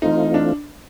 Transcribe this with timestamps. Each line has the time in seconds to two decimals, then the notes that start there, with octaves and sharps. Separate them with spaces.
0.02 E3 A3 C4 D#4 F4
0.34 D4